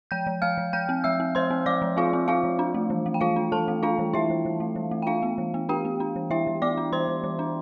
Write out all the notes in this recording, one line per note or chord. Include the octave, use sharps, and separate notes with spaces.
F3 G5 G6
F3
F3 F5 F6
F3
F3 G5 G6
C4
F3 E5 E6
C4
F3 C5 C6
C4
F3 D5 D6
F3
C4 F4 F5
C4
C4 F4 F5
F3
D4
A3
E3
A3
G5
E3 F4 F5
D4
E3 A4 A5
A3
D4 F4 F5
E3
E3 E4 E5
E3
E3
A3
E3
A3
G5
D4 F4 F5
B3
E3
B3
D4 G4 G5
B3
D4
E3
E3 E4 E5
E3
B3 D5 D6
D4
E3 C5 C6
E3
E3
D4